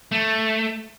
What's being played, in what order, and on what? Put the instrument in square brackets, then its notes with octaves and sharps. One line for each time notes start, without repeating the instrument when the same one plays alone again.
[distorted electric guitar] A3